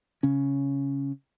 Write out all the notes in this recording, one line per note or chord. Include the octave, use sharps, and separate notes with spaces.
C#3 C#4